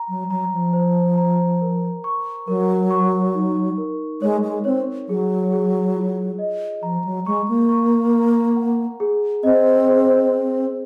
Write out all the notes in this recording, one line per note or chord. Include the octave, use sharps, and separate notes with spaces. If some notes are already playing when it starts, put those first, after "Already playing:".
Already playing: A#5
F#3
F#3 A#5
F3
C5
A#5
A#4
C#6
F#3 A#4
C#6
D#4
A#4
G#3 C#5
G#3
C4 C#5
F#3 G#4
G#4
F4
D#5
F3 A#5
F#3
G#3 C#6
A#3
C#6
A#5
F#5
G#4
C4 D#5
G#4
C5